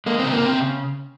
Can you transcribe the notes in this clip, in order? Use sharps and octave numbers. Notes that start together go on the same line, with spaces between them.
G#3 A#3
C#3 C4
A#3
C#3 C4